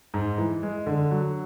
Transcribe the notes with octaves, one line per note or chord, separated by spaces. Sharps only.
G#2
E3
G#3
D3
F#3